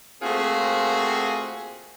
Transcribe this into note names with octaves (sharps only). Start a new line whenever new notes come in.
A3 A#3 C4 F4 F#4 G#4